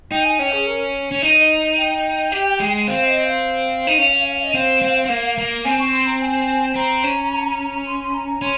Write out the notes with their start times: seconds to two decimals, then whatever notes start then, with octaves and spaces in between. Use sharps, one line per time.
0.11 D#4 G5
0.25 G#5
0.39 C#4 G5
0.52 G#4
0.67 A#4
1.12 C#4
1.21 D#4 D#5
1.40 D#5
1.59 D#5
1.77 G5
2.32 G4
2.60 G#3
2.88 C4 F5
3.01 F5
3.07 D#5
3.25 F5
3.87 D#4
3.98 C#4
4.44 D#5
4.54 C4 F5
4.82 C4
5.05 C4
5.09 A#3
5.38 A#3
5.65 C4 G#5
5.79 C#6
5.93 C6
6.06 A#5
6.21 G#5
6.75 C4 A#5
7.04 C#4
7.87 C6
8.00 C6
8.14 A#5
8.28 A#5
8.42 C#4 C6